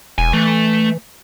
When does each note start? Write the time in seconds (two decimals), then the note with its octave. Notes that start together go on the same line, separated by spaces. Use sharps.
0.18 E1 G#5
0.33 E3 A3